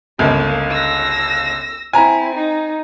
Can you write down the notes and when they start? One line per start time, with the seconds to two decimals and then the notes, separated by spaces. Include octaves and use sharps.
0.19 G1 C#2 A#3
0.71 E6 A#6
1.93 C4 E4 G#5 A#5
2.35 D#4